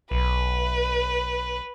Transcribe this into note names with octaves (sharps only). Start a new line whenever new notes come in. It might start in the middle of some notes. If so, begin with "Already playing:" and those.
B1 B4